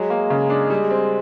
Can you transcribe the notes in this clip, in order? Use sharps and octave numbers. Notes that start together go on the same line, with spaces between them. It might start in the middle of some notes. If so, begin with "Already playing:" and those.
Already playing: F#3 G#3
A#3
C#3
D4
G3
C4